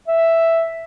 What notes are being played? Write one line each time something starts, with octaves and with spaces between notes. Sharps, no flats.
E5